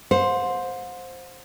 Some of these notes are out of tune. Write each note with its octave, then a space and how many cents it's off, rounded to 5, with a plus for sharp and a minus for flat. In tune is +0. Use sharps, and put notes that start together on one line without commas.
C5 +0 F#5 -45